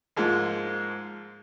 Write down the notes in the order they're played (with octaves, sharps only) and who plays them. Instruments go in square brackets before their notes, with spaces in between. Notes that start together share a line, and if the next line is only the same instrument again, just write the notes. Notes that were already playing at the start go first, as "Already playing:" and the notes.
[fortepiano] G#2 F3 G#3 A#3